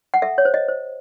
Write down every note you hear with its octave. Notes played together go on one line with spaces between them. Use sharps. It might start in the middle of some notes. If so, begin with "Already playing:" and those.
F#5
A4 E5
C#5
C5
D#5
C5